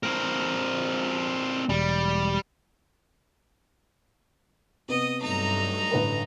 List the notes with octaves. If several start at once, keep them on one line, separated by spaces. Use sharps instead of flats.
C4 A#4
E1 G3
C3 B3 D#5 D#6
G2 F#3 A3 D#4 A#5
A1 D3 B4